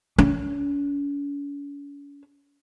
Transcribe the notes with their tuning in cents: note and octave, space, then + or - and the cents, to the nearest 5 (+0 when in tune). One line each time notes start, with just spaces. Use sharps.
C#4 +45